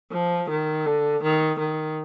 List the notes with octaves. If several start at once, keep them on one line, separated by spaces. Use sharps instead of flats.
F3
D#3
D3
D#3
D#3